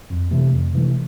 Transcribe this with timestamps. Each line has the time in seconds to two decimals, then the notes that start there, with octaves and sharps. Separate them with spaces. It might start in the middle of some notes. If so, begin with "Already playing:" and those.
0.10 F2
0.31 C3 E3 A3
0.53 F2
0.73 C3 E3 A3